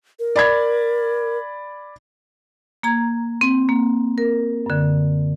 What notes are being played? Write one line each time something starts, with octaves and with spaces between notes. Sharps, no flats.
A#4
D5 B5 G#6
A#3 A#5 G#6
C4
A#3
A#4
F#2 D3